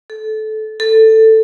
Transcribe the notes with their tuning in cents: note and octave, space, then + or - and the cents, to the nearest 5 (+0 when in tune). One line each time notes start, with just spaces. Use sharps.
A4 -20
A4 +10